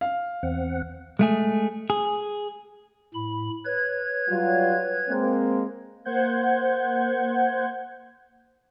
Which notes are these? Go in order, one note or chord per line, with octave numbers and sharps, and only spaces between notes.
F5
E2 C4 F#5
G#3 A3 G#4
G#4
A2 B5
B4 C#5 G#6
F#3 G3 F4
G#3 A#3 C4
A#3 C5 F#5 G6 G#6